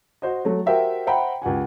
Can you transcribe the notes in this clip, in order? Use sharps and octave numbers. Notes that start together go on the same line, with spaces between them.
F#4 C5 D#5
F#3 A3
F#4 G4 A#4 C5 E5 G5
C5 E5 F#5 G5 A#5 B5
C#2 G4 F#5 G#5